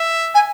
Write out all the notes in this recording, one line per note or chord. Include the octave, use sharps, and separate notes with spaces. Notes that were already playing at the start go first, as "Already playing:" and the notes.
Already playing: E5
G#5